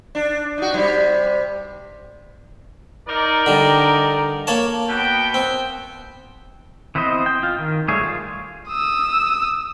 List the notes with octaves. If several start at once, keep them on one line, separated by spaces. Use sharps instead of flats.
D4
D#4 F#4
C3 G3
D#4 A#4 D5
D3 G3
A#3 C#5 A5
B2 B3 G5
C4
E3 B3 C4 C5 D#5
G5
F4
D#3
G3 A3 G#4 C#5
F4
D#6 E6